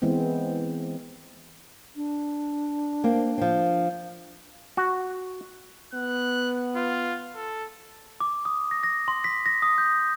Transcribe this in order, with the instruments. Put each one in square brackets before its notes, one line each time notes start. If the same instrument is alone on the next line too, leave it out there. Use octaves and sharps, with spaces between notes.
[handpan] E3 G#3 B3 C4
[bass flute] D4
[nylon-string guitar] A#3 C4
F3 C4
[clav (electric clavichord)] F#4
[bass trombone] B3 [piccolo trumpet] F#6
[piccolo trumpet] F4
A4
[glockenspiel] D6
D#6
A#6
A#6
C6
B6
A#6
D#6
G6